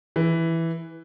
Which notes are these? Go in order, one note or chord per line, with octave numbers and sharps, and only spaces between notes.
E3